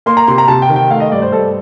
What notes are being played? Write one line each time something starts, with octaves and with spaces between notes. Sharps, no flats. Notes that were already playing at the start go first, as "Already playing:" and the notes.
A#3 C6
A#5
C3 C6
A#5
C3 A5
G5
D#3
G5
A3 F5
D#5
G2 D5
C5
G2 A4